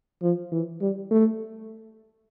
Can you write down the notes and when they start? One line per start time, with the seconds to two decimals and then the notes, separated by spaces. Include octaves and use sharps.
0.22 F3
0.52 E3
0.81 G3
1.11 A3